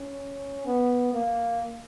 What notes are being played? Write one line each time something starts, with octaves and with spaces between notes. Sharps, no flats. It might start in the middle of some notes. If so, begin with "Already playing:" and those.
Already playing: C#4
B3
A#3